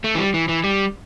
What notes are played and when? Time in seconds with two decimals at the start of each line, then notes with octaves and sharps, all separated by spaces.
0.04 A3
0.15 E3
0.18 G3
0.34 E3
0.49 E3
0.64 G3